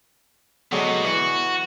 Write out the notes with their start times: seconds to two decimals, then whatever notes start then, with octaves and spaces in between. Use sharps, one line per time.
0.72 B2 D3 F#3 G#3
1.05 E3 F#4